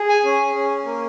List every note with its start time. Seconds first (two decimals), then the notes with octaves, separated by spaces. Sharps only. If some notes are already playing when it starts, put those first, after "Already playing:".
Already playing: G#4
0.09 G#5
0.24 C#4
0.55 C#4
0.85 A#3